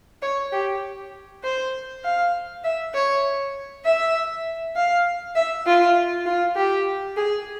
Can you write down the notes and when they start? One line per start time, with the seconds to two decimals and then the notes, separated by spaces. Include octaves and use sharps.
0.22 C#5
0.53 G4
1.43 C5
2.04 F5
2.64 E5
2.94 C#5
3.85 E5
4.76 F5
5.35 E5
5.66 F4
6.26 F4
6.56 G4
7.16 G#4